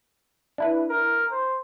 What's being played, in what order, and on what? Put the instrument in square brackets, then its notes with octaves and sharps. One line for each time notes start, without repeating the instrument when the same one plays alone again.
[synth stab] D4 E4 B4
[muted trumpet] A#4
C5